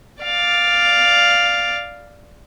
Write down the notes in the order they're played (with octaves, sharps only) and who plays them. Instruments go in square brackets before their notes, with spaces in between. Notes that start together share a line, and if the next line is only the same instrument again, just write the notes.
[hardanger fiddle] D5 F5